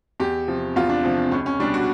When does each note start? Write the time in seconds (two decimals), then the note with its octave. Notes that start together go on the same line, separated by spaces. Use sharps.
0.20 E2 G4
0.48 C3 F3
0.76 E2 F4
0.89 D4
1.04 C3 F3
1.32 C#2 C#4
1.46 C#4
1.60 B2 G3 D4
1.74 F#4